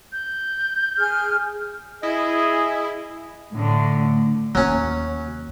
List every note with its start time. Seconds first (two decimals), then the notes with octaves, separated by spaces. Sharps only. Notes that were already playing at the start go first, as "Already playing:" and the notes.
0.12 G6
0.97 G#4 F6
2.03 E4 G#4 D#5
3.52 A2 D3
4.55 D#2 F#3 C#4